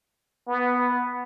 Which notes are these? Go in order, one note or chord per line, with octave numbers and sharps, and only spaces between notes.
B3